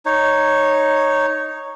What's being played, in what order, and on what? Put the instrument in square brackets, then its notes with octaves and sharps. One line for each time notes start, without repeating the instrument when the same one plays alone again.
[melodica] D#4 C#5